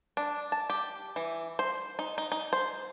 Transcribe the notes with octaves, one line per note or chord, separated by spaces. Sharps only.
D4
A5
G4
E3
C5
D#4
D#4
D#4
C5